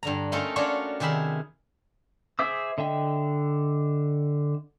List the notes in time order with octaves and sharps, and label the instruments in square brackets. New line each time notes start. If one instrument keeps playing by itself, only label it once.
[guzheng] G2 D3 A#5
A3 A#3 C#4 D#4 F4 A4
C#4 D4 F4 F#4 C#5 D5
C3 D#3 G#4 E5 B5
[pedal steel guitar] G#4 C5 E5 D6 E6
D3 D#5 E5 G5